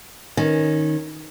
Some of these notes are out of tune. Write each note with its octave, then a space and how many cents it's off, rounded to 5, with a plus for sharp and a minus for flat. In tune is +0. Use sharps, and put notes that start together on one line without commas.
D#3 +0 C#4 -5